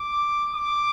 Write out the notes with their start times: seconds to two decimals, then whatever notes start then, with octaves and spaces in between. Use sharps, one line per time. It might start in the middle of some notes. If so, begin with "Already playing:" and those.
Already playing: D6
0.55 D6